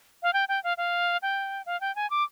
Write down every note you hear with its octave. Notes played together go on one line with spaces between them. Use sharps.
F5
G5
G5
F5
F5
G5
F5
G5
G#5
D6